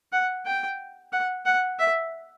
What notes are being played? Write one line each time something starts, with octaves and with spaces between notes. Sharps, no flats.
F#5
G5
F#5
F#5
E5